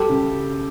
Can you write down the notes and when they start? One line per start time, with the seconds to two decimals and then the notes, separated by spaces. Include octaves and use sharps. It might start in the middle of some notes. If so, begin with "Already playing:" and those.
Already playing: G3 G4 A4
0.09 C#3